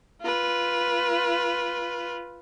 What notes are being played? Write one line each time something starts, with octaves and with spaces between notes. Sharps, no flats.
F4 B4